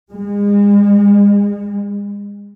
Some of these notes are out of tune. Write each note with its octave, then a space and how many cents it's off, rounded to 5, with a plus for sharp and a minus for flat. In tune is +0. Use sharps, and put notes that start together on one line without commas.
G#3 -35